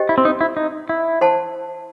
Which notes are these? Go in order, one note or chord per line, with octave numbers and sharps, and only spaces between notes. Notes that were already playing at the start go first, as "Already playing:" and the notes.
Already playing: G4 C5 D#5 G5
E4
C4
D#4
E4
D#4
E4
C5 F#5 A5 C6